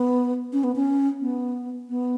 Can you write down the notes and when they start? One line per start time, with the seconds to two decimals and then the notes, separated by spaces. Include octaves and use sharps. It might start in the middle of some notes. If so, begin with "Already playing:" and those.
Already playing: B3
0.53 C#4
0.64 B3
0.76 C#4
1.21 B3
1.89 B3